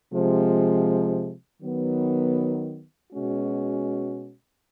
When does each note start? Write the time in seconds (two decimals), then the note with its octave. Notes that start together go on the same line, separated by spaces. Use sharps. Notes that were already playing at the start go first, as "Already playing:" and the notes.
0.13 C3 F3 G#3
1.62 D#3 F#3 B3
3.12 B2 G#3 C#4 F#4